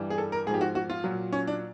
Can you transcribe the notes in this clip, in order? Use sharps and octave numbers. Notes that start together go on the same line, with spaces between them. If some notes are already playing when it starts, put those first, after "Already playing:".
Already playing: G2 E3 G3
G#4
A4
A#4
G#2 F3 G4 G#4
F#4
F#4
F4
A#2 F#3
C#4
D4